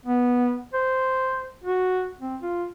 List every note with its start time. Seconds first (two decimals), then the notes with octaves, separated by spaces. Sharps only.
0.06 B3
0.74 C5
1.64 F#4
2.21 C4
2.42 F4